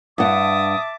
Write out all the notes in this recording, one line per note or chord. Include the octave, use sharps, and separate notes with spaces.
G2 E5 F#5 A5 D6 D#6